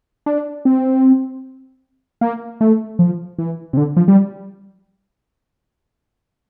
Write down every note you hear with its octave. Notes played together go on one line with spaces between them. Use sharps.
D4
C4
A#3
A3
F3
E3
C3
D3
F3
G3